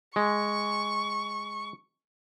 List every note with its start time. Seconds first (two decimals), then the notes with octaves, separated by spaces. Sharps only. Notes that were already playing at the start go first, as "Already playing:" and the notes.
0.16 G#3 C#6